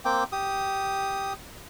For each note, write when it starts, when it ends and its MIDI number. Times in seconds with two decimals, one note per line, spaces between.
0.05 0.24 58
0.05 0.24 60
0.05 0.24 79
0.05 0.24 86
0.32 1.33 67
0.32 1.33 87